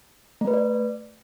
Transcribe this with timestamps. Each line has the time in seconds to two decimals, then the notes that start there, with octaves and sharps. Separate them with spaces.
0.41 A3
0.47 B4
0.54 D5